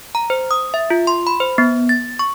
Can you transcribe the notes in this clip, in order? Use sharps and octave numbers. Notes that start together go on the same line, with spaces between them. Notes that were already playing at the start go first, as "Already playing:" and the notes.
A#5
C5
D#6
E5
F4
C6
B5
C5
B3
A6
C#6